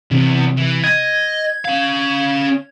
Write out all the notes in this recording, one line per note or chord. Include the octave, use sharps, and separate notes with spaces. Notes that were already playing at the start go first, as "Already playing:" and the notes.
E2 C3
E3
D#5 G#6
C#4 F5